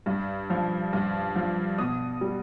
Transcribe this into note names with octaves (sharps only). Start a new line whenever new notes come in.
G2
F3
G2
F3
B2 D#6
G3